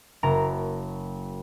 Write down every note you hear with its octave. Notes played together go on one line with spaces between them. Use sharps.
F#1 A#4 A#5 A#6